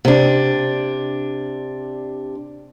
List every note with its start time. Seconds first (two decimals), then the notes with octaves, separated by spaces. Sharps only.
0.05 C3 D4